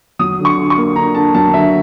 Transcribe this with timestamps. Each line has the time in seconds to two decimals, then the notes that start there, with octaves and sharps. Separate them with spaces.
0.19 F#3 D#6
0.40 D3
0.45 C#6
0.58 D3
0.70 C#6
0.77 A#3
0.96 D3 A#5
1.14 D3 A5
1.34 F#3 A5
1.53 D3 E5